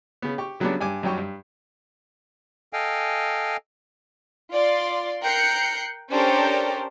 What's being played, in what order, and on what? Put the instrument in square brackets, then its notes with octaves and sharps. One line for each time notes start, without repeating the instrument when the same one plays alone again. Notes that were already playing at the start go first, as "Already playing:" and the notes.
[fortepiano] C#3 B3
G4 C#6
C#3 F#3 G3 B3 C#4 D4
G2 G#5 D6
F#2 F#3 G3 G4 C#6
G2
[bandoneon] A4 D#5 F5 G5 G#5
[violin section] F4 D5 C6
A#4 G5 F#6 G6 C7 C#7
C#4 D4 G4 A4 A#4 C5